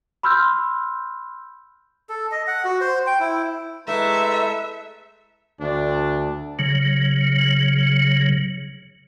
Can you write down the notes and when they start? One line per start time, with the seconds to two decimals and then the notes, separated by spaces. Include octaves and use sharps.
0.23 B5 C6 E6 F6 G6
2.09 A4
2.32 D#5
2.47 F#5
2.64 F#4
2.81 C5
3.07 G5
3.20 E4
3.88 G#3 A3 E4 B4 E5 A#5
5.60 D2 D4
6.59 C#3 F#3